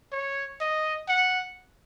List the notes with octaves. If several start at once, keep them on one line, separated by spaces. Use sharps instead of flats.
C#5
D#5
F#5